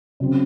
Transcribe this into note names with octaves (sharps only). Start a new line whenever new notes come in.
C#3 F#3 C4